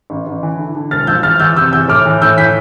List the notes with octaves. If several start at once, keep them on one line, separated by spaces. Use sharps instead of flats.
A1
A1
E3
D3
D3
E1 F6 A6
F3 E6 G6
E2 F6 A6
E2 E6 G6
C3 E6 G6
E2 E6 G6
A2 D6 F6
E3
A2 E6 G6
E3 G6 B6